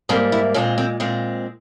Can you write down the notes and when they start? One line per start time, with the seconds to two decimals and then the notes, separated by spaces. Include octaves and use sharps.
0.09 G#2 G3 A#3 C4
0.32 E4
0.54 A#2 G#3 C4 C#4
0.78 C4
1.00 A#2 G#3 C4